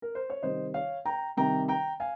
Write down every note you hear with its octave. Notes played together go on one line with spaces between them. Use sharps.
A#4
C5
C#5
C3 D#3 G3 C5 D#5
C#5 F5
G5 A#5
C3 D#3 G3 G5 A#5
G5 A#5
F5 G#5